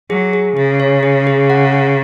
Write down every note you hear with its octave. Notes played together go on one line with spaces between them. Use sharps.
F#3 G#4
G#4
C#3 G#4
C#5
G#4
G#4
F#5
G#4